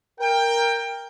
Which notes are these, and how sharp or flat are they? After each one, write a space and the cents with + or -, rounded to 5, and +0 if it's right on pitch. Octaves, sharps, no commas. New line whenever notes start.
A#4 +0 G5 +20